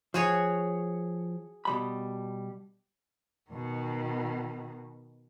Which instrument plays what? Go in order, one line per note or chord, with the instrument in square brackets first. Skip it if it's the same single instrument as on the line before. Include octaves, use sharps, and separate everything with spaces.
[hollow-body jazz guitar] F3 [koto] F#4 G#4 C#5
[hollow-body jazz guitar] B2 G3 B5
[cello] B2 D#3